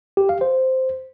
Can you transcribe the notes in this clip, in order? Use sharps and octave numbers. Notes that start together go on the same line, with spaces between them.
G4
F5
C5